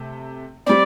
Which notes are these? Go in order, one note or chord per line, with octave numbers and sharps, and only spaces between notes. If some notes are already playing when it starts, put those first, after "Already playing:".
Already playing: C3 A3
G3 C4 D5